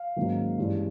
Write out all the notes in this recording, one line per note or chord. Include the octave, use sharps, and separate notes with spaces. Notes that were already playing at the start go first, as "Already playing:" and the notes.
Already playing: F5
G#2 D#3 F#3 A#3 C#4
G2 E3 G#3 C#4